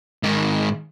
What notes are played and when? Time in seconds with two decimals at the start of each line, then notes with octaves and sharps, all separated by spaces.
0.23 G#2 D#3